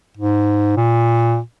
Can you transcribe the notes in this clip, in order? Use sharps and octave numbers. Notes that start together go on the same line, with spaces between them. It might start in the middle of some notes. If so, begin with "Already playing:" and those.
G#2
A#2